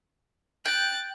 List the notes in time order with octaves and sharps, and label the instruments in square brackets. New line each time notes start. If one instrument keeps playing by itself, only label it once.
[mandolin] G5 [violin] F#6 A6